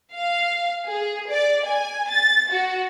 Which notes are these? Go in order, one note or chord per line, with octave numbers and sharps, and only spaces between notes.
F5
G#4
D5
G#5
A6
F#4